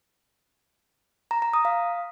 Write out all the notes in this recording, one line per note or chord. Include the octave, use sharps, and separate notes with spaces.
A#5
A#5
D#6
F5